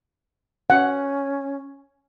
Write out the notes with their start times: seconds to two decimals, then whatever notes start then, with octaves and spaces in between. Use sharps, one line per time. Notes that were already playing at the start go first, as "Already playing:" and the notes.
0.70 C#4 F#5